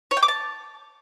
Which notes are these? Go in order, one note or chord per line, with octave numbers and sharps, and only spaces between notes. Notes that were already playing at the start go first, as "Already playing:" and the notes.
C#5
G5
D6
A5